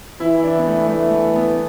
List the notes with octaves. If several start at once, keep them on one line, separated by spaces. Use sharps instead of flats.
E3 E4
D4
B3
A3
E3 A3
A3
B3